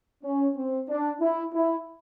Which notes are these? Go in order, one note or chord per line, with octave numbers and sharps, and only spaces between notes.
C#4
C4
D4
E4
E4